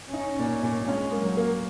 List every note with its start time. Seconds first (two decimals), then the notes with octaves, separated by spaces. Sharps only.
0.13 C#4 D#4
0.39 A#2
0.63 A#2
0.87 G#3 C#4
1.12 A#3
1.25 F#3
1.37 A#3